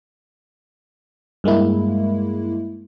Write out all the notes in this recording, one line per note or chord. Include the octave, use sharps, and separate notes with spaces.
G2 G#3 A#3 E4